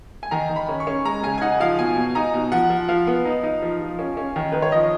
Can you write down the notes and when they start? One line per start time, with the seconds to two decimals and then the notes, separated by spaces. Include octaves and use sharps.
0.23 G#5
0.31 D#3 A#5
0.49 D#3
0.56 B5
0.69 C#4
0.80 C#6
0.87 C#4
1.05 G#3 A#5
1.23 C#3 G#5
1.38 G#5
1.42 D#4 F#5
1.60 F3 F5
1.79 B2 G#5
1.97 B2
2.15 D#4 A#5
2.34 B2
2.52 F3 F#5
2.70 F3
2.88 F3 F5
3.07 B3
3.25 D#4
3.43 D#4
3.62 F3
3.80 F3
3.99 C#4
4.17 C#4
4.36 D#3
4.52 D#3 B4
4.62 C#5
4.72 F3 D#5